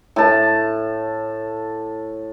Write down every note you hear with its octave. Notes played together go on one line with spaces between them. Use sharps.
A2 A5